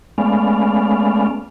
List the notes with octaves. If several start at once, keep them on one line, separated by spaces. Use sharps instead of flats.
G#3 A3 B3 C#4 D5 F5